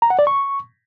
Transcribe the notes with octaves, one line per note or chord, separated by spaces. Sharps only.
A#5
F#5
D5
C#6